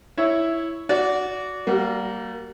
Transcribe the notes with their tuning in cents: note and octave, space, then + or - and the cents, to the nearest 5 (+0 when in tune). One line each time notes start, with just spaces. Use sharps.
E4 +0 C#5 +0
F#4 -5 D5 -20
G3 -20 A#3 +0 F#4 +20